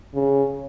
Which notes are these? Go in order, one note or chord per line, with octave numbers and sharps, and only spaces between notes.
C#3